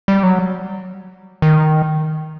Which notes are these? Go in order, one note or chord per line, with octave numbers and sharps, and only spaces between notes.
G3
F#3
D#3